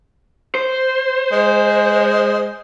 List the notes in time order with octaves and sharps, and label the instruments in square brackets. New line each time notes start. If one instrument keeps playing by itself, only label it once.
[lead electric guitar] C5
[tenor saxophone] G#3